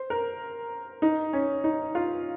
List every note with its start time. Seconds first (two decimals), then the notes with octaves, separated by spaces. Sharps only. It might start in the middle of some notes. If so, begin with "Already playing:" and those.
Already playing: C5
0.10 A#4
1.02 D#4
1.33 C#4
1.64 D#4
1.95 F4